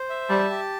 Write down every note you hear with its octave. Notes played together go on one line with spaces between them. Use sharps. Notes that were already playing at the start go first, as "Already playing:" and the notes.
Already playing: C5
E5
G3 A5
G4